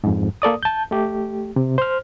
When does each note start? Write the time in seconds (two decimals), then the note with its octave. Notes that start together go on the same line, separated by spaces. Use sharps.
0.04 F2 G#2
0.42 A#3 A4 D5 D#6
0.63 A5 G6
0.91 A3 G4
1.56 C3
1.78 C5 F6